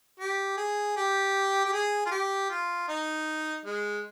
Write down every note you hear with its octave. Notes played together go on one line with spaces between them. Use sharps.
G4
G#4
G4
G4
G#4
F4
G4
F4
D#4
G#3